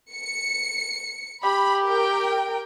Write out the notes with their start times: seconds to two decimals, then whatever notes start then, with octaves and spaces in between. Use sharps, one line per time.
0.13 C#7
1.43 G4 B5
1.84 A#4 G5